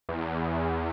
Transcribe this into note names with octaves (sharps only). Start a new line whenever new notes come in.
E2